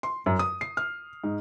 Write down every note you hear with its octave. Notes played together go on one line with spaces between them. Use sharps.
C6
F#2
D#6
C7
F6
G#2